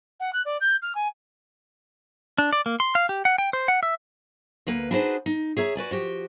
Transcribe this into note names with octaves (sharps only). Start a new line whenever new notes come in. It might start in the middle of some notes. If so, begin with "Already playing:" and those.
F#5
F#6
D5
G6
F6
G#5
D4
D5
A#3
C6
F5
G4
F#5
G5
C5
F#5
E5
D2 A#3 B4 A#5
D4 D#4 F#4 G#4 B4 C5
D#4
G#4 C#5 E5 A#5
F#4 B4 D5 G#5
F3 F#4 G4